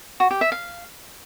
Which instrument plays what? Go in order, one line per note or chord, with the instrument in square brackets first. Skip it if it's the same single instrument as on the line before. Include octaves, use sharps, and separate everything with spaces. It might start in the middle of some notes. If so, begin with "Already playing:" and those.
[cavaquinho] F#4
G4
E5
F5